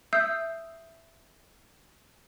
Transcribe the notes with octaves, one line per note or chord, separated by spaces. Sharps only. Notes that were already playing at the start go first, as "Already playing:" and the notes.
E5 D#6 E6 G6 C7